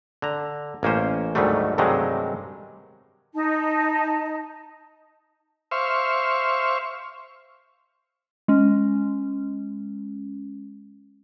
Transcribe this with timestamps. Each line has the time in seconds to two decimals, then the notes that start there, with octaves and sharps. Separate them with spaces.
0.22 D3 A#5
0.83 A1 A#3 C#4 C5
1.35 D2 G#2 D#3 F#3 G3 A3
1.78 G2 C3 D#3 F#3 G#3 A3
3.35 D#4 A5
5.71 C5 E5 F5 C#6
8.48 G#3 C#4